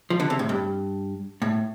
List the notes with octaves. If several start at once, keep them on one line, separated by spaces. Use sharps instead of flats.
F3
D3
C3
A2
G2
A2